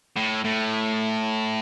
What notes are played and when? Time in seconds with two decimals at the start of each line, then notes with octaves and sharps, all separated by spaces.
0.16 A2
0.44 A2